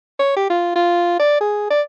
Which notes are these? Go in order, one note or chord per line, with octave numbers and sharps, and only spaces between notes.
C#5
G4
F4
F4
D5
G#4
D5